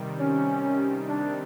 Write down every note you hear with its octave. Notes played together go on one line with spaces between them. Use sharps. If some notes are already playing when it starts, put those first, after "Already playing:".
Already playing: C3 D#3 G3
C#4
D4